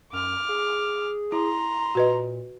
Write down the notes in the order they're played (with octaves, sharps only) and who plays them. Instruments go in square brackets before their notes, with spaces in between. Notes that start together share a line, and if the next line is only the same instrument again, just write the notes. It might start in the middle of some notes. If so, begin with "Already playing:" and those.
[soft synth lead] F#2 [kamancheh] D6 F6
[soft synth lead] G#4
[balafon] E4 [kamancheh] A#5 C6
[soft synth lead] A#2 [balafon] F#4 B4 D#5